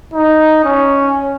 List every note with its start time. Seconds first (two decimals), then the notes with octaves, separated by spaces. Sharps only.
0.14 D#4
0.65 C#4